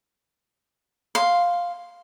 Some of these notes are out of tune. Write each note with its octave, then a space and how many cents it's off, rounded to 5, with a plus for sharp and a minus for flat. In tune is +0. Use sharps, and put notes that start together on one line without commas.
F5 +5 C6 +0